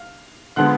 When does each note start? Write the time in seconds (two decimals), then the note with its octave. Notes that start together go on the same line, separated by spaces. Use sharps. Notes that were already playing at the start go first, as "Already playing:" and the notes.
Already playing: F5
0.56 D3 F3 G#3 B3 F#5 F#6